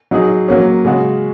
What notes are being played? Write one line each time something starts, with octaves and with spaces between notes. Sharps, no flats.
F#3 D#4 G#4
F#3 A#3 C#4
C#3 G#3 F#4